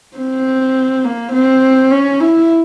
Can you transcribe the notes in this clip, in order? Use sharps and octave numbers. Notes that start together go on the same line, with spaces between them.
C4
A#3
C4
C#4
E4